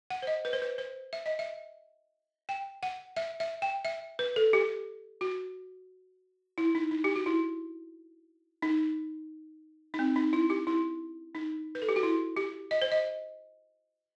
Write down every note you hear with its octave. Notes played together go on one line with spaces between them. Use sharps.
F#5
C5
D#5
B4
C5
B4
C5
E5
D#5
E5
G5
F#5
E5
E5
G5
E5
B4
A4
G4
F#4
E4
D#4
D#4
G4
F#4
E4
D#4
D#4
C4
D#4
E4
G4
E4
D#4
B4
A4
G4
F#4
E4
G4
D#5
C5
D#5